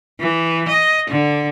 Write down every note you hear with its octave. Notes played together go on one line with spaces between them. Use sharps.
E3
D#5
D3